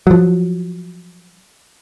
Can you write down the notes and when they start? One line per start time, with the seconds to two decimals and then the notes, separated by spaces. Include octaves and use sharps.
0.07 F3 F#3